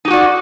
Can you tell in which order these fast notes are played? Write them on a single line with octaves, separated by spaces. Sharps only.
D#4 G4 F#4 D5